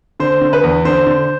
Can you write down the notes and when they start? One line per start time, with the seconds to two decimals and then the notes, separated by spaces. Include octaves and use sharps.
0.20 D3 C5
0.41 D3
0.53 B4
0.63 E2
0.85 D3 C5
1.07 D3